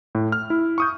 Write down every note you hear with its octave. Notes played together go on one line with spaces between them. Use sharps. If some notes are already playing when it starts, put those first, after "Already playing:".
A2
F6
E4
C#6 D#6 G6